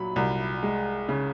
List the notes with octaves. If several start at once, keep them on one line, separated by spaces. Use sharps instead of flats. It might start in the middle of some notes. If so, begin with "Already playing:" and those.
Already playing: A#2 F#3 B5
C2
G#3
C#3